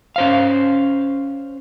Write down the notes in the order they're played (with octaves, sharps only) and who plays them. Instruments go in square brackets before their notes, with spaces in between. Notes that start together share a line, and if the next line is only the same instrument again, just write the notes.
[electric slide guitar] C#4 C5 F5